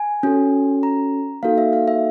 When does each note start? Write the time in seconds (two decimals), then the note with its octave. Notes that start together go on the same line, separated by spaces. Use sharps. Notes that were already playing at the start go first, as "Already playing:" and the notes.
Already playing: G#5
0.23 C#4 F#4 A4
0.83 A#5
1.43 A#3 D#4 F#4 A4 F5
1.58 E5
1.73 F5
1.88 E5